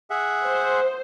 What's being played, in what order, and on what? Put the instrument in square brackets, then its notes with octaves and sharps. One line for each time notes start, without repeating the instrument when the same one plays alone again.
[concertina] G#4 E5 F#5
[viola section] C5